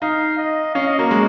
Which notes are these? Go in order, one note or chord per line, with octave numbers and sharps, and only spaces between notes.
D#4 F5
D#5
C#4 F5
D#5
A#3 F#4
G#3